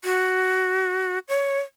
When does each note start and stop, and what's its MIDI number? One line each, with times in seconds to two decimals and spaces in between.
0.04 1.19 66
1.29 1.59 73